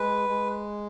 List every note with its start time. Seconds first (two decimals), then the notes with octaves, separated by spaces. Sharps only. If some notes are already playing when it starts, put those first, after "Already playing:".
Already playing: G#3 B4
0.29 G#3